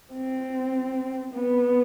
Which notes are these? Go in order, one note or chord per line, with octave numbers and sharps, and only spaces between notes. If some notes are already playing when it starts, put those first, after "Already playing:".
C4
B3